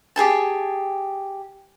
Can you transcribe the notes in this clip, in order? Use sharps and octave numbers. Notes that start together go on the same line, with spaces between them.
G4 G#4 G#5 A5